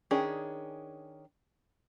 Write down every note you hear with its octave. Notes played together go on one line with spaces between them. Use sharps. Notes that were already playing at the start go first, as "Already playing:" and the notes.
D#3 C#4 D4 G#4